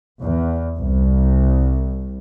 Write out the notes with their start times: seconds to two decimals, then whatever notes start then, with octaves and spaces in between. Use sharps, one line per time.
0.21 E2
0.77 C2